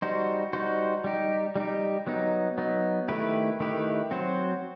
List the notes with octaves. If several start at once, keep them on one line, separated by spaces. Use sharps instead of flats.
G3 D#4 F#4 C5
G3 D#4 F#4 C5
G3 D#4 G4
G3 D#4 G4
F#3 B3 D#4
F#3 B3 D#4
D#3 A3 E4 G4 B4
D#3 A3 E4 G4 B4
F#3 C4 F#4 C5